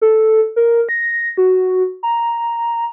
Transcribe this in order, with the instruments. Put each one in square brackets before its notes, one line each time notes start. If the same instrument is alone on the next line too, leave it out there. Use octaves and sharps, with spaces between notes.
[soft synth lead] A4
A#4
A#6
F#4
A#5